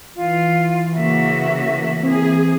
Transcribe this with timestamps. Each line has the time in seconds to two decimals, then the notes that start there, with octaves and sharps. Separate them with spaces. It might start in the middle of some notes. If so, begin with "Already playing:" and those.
0.16 E3 F4
0.94 C#3 A#3 F#4 E5
2.03 A#3 C4 G#4